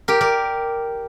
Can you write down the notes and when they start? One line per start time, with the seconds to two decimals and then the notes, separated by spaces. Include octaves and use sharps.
0.08 G4 A#4
0.21 A#4 D5